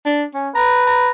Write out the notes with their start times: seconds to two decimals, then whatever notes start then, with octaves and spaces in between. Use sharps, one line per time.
0.06 D4
0.35 C#4
0.55 B4 A#5
0.87 A#5